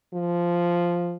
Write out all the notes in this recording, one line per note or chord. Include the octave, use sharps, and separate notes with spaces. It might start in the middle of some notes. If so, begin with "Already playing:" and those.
F3